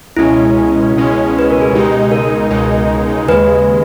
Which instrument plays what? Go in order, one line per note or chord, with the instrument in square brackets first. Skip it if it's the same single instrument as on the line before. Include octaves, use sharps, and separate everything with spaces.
[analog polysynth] C#2 B2 G#3 C#4 [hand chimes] E4
[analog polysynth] C#2 B2 G#3 C#4
[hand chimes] B4
A#4
G#4
[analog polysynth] C#2 B2 G#3 D#4 [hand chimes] G4
[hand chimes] A#4
[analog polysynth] C#2 B2 G#3 D#4
[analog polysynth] D#2 C#3 G#3 [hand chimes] B4